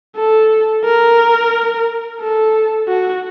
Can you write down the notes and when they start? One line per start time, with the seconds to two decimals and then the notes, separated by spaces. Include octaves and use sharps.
0.16 A4
0.84 A#4
2.21 A4
2.88 F#4